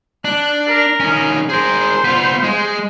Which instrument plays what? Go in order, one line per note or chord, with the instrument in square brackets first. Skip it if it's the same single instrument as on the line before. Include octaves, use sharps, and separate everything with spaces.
[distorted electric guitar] D4 [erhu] F#6
[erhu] A#4
[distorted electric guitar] D#3 C#4
[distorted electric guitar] G#4 A#4 [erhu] C5
[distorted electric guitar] B3 F4
G#3